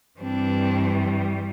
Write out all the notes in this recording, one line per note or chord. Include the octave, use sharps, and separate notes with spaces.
G2 E3 G3 C4 D4